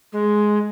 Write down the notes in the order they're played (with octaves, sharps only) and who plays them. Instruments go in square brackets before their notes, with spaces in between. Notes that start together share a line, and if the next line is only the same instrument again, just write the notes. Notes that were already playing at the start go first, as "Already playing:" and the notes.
[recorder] G#3